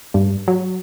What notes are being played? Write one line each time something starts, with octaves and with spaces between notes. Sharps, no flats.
G2
F#3